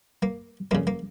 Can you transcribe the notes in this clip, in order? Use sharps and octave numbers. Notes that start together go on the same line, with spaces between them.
A#3
F2 C#3 A#3
A#3